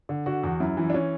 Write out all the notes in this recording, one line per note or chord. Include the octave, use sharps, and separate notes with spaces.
D3
D3 F#4
E2
F#2 E4
E3
D4
E3 C#4